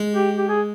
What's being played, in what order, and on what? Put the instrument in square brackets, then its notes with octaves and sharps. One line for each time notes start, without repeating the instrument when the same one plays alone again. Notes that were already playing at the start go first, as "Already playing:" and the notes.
Already playing: [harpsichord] G#3
[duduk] G4
G4
G#4